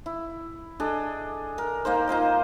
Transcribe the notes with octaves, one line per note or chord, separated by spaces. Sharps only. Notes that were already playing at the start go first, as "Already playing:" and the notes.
E4
D4 G#4 A4 D#5
A#4
A#3 D#4 C5
D#4 F4 C5 D#5